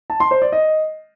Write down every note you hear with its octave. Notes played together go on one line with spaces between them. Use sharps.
A5
C6
C5
D5
D#5